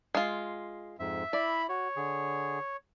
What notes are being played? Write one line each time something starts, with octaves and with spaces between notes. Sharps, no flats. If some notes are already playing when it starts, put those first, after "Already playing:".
G#3 F4
F2 G#2 E5
E4 D5 B5
F#4 C#5
D3 G#4